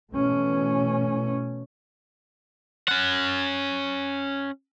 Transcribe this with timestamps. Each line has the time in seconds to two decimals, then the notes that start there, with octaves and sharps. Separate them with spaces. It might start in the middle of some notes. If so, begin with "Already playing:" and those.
0.13 B2 E3 A3 C#4
2.88 C#4 F#5